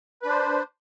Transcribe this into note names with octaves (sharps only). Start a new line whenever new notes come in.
D4 B4 C5